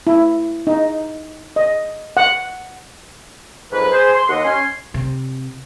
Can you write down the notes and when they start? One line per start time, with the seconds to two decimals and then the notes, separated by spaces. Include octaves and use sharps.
0.07 E4
0.67 D#4
1.56 D#5
2.17 F#5
3.72 F2 G#2 F#3 B4
3.92 G#4 C5
4.14 C6
4.29 D#2 D#5 F#5
4.44 C#4 G#5 C6
4.94 C3